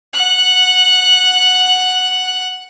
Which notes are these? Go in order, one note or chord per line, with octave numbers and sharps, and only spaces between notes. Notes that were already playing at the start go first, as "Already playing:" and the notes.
F#5 F#6